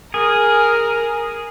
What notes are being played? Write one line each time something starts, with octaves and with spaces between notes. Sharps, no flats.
G#4 A#4